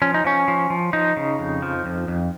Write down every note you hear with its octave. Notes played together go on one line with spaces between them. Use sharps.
F3 C#4
D#4
F3 C#4
F3
F3
F3 D#4
C#3
F2
F3
F2
F2